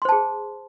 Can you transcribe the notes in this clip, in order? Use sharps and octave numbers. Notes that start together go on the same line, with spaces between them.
G#4 C5 A5 C6